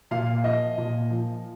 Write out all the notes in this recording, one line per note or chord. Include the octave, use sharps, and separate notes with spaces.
A#2 F5
F3 D#5
A#2
F3